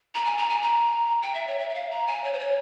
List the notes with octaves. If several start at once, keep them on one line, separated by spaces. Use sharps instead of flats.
A#5
G#5
A#5
G#5
A#5
G5
E5
C#5
E5
E5
F5
A#5
G#5
C#5
C5
C#5